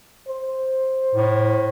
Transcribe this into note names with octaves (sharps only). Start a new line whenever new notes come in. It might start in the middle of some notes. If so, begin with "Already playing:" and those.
C5
A2